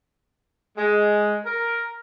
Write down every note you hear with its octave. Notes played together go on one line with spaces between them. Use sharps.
G#3
A#4